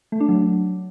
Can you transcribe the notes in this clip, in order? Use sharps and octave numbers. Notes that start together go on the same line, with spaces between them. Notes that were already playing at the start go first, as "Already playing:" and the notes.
A3
D4
F#3